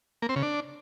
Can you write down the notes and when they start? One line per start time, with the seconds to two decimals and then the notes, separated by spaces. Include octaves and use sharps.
0.22 A#3
0.29 C4
0.36 C#3
0.43 D4